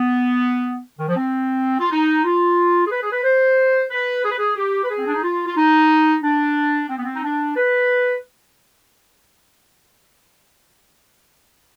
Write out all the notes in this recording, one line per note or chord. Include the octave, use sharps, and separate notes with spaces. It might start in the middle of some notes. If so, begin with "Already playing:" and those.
Already playing: B3
D#3
F3
C4
F4
D#4
F4
G#4
B4
G#4
B4
C5
B4
G#4
B4
G#4
G4
B4
G#4
C4
D4
D#4
F4
F4
D#4
D4
C4
B3
C4
D#4
D4
B4